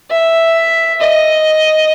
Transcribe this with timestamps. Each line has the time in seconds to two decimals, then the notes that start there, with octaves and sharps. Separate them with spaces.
0.11 E5
1.01 D#5